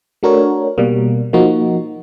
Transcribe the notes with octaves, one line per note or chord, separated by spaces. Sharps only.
A3 D4 F#4 A#4 C#5
B2 G3 A#3
F3 A#3 D#4 F#4